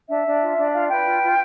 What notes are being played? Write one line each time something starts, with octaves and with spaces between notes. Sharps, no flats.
D4 E5
D4
F4
D4
F4 F5
B4 G5
F4
F4